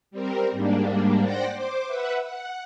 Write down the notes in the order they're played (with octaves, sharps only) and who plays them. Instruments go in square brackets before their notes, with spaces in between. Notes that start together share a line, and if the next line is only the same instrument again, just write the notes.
[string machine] G3 C4 A#4
G#2 G3 A#3 D4
C5 D5 F#5 G5 D6 A#6
C5 D6
B4 E5 F#5
F#5